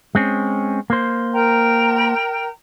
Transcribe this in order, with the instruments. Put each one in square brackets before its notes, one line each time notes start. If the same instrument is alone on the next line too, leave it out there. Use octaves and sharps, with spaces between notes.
[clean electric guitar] G#3 C4 C#4
A#3 C5
[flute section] A#4 G5 A#5